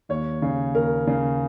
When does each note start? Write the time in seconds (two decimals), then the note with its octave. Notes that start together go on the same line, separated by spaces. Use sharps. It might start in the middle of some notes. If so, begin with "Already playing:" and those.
0.09 D#2 C#5
0.42 C#3
0.75 D#2 A#4
1.07 C#3